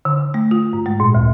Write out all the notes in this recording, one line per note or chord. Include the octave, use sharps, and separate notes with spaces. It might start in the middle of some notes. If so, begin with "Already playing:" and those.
D3
A3
F4
G#2
G#3
A#2
D2